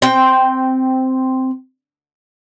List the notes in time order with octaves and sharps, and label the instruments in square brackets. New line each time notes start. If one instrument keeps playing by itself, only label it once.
[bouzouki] C4 G5